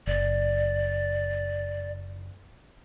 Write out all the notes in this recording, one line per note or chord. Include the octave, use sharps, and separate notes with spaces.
F#1 D5